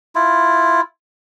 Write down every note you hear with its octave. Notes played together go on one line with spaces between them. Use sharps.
E4 F4